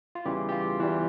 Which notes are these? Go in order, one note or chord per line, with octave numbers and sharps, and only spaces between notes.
F4
E2 C#3 E3 G3 G4
G4
F4
E2 E3 G3